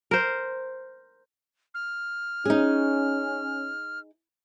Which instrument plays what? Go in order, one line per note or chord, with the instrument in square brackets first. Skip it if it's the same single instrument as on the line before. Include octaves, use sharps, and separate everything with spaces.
[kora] A#4 C5
[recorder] F6
[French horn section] C#4 [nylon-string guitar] D#4 G#4